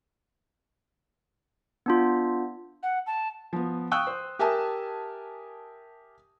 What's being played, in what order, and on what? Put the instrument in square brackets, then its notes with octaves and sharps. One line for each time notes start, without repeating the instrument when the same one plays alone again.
[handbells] B3 D4 F4
[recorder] F#5
A5
[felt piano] F3 B3
F5 G5 C#6 D#6 E6 F#6
C5
G4 A#4 E5 G#5 A5 D#6